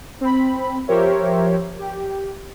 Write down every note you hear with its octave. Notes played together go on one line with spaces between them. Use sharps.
C4 B5
F3 G4 A#4 C5 C#5 E5
G4